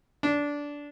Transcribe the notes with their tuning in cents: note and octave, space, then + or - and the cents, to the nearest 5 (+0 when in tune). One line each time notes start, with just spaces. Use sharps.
D4 -15